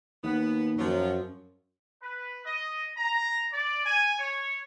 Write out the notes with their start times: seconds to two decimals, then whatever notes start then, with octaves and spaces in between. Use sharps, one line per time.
0.24 D#2 B3
0.78 F#2 F3 F#3
2.03 B4
2.45 D#5
2.97 A#5
3.53 D5
3.85 G#5
4.19 C#5